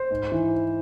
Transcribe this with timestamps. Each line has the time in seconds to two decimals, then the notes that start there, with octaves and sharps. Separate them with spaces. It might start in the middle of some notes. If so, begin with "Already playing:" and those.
Already playing: C5
0.11 G#2
0.32 E3